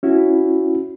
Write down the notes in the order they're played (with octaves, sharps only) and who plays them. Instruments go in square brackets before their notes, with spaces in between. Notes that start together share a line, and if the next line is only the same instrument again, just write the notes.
[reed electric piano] C#4 E4 F#4